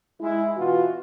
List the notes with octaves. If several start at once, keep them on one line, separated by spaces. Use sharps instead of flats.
G#3 E4
B2 E3 F4 F#4